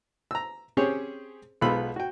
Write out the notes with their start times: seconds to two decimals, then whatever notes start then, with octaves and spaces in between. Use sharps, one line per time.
0.31 A#5 E6
0.77 C4 C#4 G4 G#4 C5 C#5
1.61 B1 G#3 B3 F4 B5 E6
1.96 F#4 G5